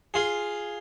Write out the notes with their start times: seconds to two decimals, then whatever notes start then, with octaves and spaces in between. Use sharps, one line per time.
0.14 F4 G#4